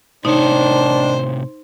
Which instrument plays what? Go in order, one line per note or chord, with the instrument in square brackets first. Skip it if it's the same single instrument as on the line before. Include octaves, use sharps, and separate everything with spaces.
[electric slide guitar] A2 C3 C#5 [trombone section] D#3 D4 [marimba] D#4 [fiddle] C5